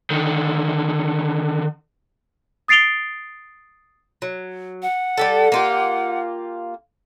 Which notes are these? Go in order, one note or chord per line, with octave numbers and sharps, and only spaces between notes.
D3 D#3
D#6 A6 C7 D7 F7 G7
F#3
F#5
G3 G4 A4
A#3 F4 G4